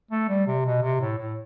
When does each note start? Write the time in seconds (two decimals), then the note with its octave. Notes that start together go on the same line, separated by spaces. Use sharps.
0.11 A3
0.29 G3
0.47 C3
0.65 B2
0.82 C3
1.00 A2
1.18 A2